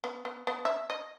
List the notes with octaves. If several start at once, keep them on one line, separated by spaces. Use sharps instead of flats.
B3
B3
B3
E5
D#5